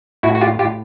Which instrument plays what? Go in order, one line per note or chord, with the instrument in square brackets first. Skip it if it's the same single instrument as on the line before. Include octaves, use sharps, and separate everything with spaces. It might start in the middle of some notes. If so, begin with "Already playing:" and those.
[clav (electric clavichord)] A2 E4 F#4
F#4
F4 G4
A2 F4 G4